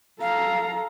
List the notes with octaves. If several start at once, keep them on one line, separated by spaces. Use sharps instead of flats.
A4 F5 A#5